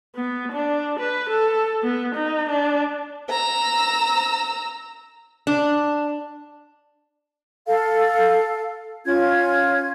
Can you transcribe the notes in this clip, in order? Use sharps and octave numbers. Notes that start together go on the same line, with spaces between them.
B3
D4
B4
A4
B3
D#4
D4
A#5 E6
D4
A4 F5
C#4 F4 G#6